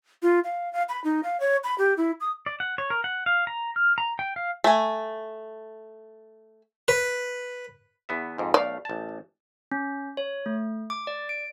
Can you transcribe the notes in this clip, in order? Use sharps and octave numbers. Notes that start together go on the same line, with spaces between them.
F4
F5
F5
B5
D#4
F5
C#5
B5
G4
E4
D#6
D5
F#5
C#5
A#4
F#5
F5
A#5
F6
A#5
G5
F5
A3 G#5
B4
E2 B3 E5
F2 G#2
B1 A3 D5 F5
A1 A5
C#4
C#5
A3
D6
D5
D7